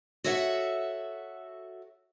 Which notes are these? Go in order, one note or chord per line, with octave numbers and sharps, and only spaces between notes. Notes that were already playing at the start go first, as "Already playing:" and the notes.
F#4 A4 C#5 E5 F#5